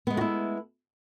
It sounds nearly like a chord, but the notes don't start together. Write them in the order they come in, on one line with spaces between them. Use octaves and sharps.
B3 G#3 A3 F#4 E4